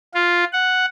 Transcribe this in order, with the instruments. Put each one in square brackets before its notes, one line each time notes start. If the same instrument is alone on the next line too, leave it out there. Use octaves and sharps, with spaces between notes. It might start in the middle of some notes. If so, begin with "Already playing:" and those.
[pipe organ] F4
F#5